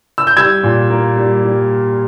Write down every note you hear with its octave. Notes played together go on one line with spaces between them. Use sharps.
E6
G6
G3 E6 G#6
A#2
A#3
G3
G3